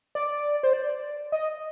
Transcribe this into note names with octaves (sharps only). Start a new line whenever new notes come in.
D5
C5
D5
D#5